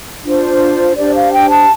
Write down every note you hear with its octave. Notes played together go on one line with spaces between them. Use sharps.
D4 F4 C5
D4 G4 C5 D5
F5
G5
A5